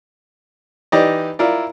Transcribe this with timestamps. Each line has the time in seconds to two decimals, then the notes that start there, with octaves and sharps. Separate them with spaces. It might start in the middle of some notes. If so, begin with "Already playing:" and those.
0.92 E3 D#4 G4 D5 D#5
1.39 E4 F4 A#4 D5